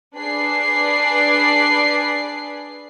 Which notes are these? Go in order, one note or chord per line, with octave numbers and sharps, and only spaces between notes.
D4 G#4 B4 D5 C7